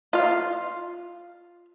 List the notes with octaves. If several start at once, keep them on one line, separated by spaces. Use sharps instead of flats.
F4 F5